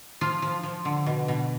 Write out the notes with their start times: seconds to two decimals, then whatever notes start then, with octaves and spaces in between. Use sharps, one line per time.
0.21 F3 F4
0.42 F3
0.63 F3
0.85 D3
1.06 B2
1.28 B2